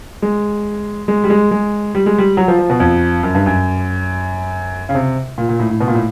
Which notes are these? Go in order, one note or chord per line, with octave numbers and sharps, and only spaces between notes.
G#3
G#3
G3
G#3
G#3
G3
G#3
G3
F#3
F3
F3
B2
F2
F#2
G2
F#2
C#3
C3
A#2
A#2
A2
A2
B2
A#2
A2